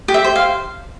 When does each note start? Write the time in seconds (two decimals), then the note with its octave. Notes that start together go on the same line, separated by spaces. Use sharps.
0.08 G4
0.14 E5
0.24 C5
0.36 F5